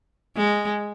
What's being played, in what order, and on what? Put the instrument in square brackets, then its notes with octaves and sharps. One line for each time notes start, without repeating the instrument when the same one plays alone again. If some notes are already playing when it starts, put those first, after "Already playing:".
[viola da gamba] G#3